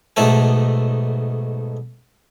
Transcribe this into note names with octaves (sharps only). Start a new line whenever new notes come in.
B1 G#2 B2 A3 A4 G#5